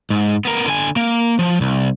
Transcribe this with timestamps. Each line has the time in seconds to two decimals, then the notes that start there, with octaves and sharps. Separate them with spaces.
0.10 G#2
0.45 B3 A#4
0.66 D3 G#5
0.97 A#3
1.39 F3
1.61 C2